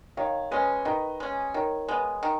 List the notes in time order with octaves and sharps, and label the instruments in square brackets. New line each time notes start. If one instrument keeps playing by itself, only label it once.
[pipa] D#3 [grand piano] C#5 F5
[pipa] G#3 C#4 [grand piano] B4 D#5
[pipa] D#3 [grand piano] B4 D#5
[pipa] G#3 C#4
[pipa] D#3 [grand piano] A#4 C#5
[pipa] G#3 B3
D#3